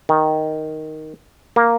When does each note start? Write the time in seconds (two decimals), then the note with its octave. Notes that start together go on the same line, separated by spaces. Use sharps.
0.09 D#3
1.56 A#3